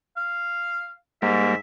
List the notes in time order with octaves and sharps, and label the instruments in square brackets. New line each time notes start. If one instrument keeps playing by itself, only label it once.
[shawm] F5
[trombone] G#2 [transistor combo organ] G3 A#3 [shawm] E5